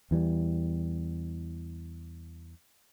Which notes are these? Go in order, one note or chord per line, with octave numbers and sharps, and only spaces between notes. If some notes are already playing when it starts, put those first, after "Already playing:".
E2 E3 G3